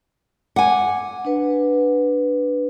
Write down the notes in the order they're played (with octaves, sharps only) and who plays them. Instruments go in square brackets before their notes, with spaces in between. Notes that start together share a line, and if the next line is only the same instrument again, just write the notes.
[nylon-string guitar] F#5 G#5 [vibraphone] D6
[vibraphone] D4 B4